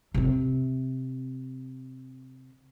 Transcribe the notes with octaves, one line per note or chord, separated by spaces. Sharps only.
C3 C4